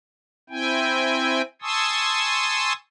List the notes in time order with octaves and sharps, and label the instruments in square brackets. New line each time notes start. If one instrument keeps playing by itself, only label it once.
[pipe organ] C4 E4 G5 G#5
G#5 A5 C6 C#6 D#6 E6